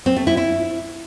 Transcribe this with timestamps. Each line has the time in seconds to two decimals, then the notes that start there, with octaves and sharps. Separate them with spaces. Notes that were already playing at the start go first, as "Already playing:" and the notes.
0.06 C4
0.16 A3
0.27 E4
0.37 E4